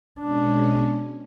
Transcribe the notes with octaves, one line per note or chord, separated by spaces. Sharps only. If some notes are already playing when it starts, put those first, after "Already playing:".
B2 G#3 C#4 D4